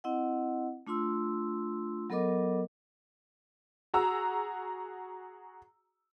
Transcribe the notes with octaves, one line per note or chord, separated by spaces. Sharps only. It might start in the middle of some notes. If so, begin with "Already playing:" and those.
C4 E4 D#5 F#5
A3 D4 F4 C6 E6
F#3 B3 A4 A#4 D#5 D6
F#4 G#4 A#5 E6